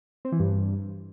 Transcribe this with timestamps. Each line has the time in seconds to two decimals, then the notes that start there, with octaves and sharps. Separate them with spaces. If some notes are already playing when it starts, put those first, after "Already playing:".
0.25 C4
0.32 E3
0.40 G2